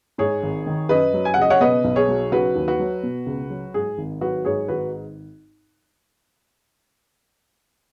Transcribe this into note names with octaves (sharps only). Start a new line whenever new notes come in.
G#2 G#4 C#5
G#1
D#3
F#2 B4 D#5
F#3
G#5
F#5
C#3 D#5
C#5 F#5
B2 B4 D#5
B1
G#4 C#5
F#3
C#3 F#4 B4
D#2
F#4 B4
F#3
B2
C#2
F#3
G#2 G#4
G#1
F#3 F#4 B4
G#2 G#4 C#5
G#1 F#4 B4